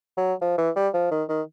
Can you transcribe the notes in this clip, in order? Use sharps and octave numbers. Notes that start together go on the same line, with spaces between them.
F#3
F3
E3
G3
F3
D#3
D#3